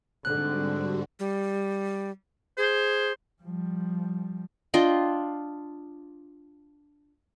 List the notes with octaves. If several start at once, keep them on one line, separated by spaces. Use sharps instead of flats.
G#2 D3 G3 C4 F#4 F#6
G3
G#4 C5
F3 G3
D4 F4 D#5 G5